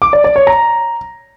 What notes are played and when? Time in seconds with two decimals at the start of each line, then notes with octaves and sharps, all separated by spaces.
0.02 D6
0.13 D5
0.24 D5
0.36 C#5
0.47 A#5